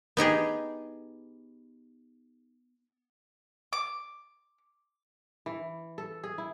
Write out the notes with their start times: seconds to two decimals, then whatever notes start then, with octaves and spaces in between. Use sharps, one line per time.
0.17 B3 D#4 G4 G#4
3.73 D6
5.46 E3
5.98 A4
6.24 G#4
6.38 E4